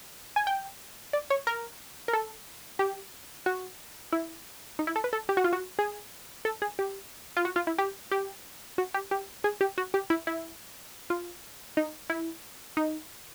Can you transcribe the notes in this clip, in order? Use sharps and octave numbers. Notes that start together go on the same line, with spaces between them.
G#5
G5
D5
C#5
A#4
A#4
A4
G4
F#4
E4
D#4
E4
A4
B4
A4
G4
F#4
F4
F#4
G#4
A4
G#4
G4
F4
F#4
F4
E4
G4
G4
F#4
G4
G4
G#4
G4
F#4
G4
E4
E4
F4
D#4
E4
D#4